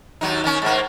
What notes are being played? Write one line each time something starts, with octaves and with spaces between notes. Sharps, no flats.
D#2 F#3 D#4
D#3 C#4
G#2 A#3